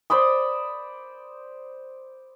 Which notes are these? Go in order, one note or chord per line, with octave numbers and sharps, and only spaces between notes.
C5 D5 B5 D#6